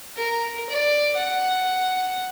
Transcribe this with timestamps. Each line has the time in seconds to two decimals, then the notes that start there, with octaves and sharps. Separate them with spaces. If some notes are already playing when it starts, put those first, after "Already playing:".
0.16 A#4
0.69 D5
1.17 F#5